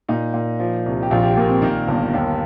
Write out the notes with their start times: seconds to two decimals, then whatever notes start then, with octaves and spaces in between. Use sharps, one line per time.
0.08 A#2 D#4
0.34 A#2
0.59 F3
0.86 C2
1.03 G4
1.11 A#1 F4
1.23 G4
1.37 A#2 A#3
1.50 C4
1.62 D#3 A#3
1.88 G1
2.14 D#2